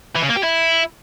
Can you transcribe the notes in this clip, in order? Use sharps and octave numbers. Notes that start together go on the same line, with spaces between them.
E3
C#3
A#3
G4
E4